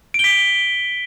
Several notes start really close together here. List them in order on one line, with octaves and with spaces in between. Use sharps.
D7 G7 B6